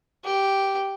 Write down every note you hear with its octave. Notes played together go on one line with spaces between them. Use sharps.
G4